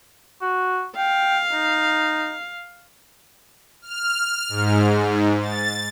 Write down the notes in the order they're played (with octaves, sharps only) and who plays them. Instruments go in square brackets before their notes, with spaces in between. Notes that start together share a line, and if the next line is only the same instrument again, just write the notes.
[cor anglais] F#4
[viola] F5 [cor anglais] G5
[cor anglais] D#4
[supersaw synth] F6
G#2
A6